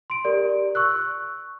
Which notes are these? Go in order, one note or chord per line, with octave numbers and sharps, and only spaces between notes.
C6 D7
G4 A#4 D5
C#6 E6 F#6